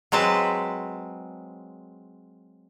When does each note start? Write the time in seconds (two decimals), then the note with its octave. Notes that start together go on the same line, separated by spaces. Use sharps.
0.12 F#3 G#3 C4 B4 A5